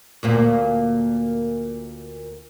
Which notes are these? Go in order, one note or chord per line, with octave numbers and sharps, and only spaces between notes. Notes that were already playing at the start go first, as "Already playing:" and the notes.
D2 A#2 A#3